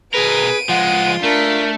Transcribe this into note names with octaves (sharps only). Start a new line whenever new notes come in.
B2 G#4 A#4 B4 D7 D#7
F3 G#3 F4 F#5
A3 D4 A#4 B6